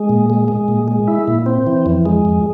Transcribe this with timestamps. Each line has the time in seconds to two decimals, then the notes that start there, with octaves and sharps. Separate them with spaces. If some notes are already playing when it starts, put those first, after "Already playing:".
Already playing: G#3
0.09 A#2
0.30 G#3
0.48 G#3
0.68 A#2
0.88 G#3
1.08 E4
1.28 A#2
1.46 C4
1.67 E3
1.86 F2
2.05 G#3
2.25 F2